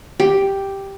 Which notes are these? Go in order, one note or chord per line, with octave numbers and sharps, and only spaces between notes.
G4